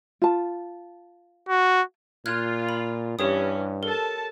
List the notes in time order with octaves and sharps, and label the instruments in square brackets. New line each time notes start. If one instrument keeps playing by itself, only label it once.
[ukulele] F4 A5
[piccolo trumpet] F#4
[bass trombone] A#2 [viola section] F4 [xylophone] F6 F#6 G#6
[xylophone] B5
[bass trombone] G2 [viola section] E3 C#4 [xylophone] G4 C#5 D#6
[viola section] A4 A5 [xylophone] A#4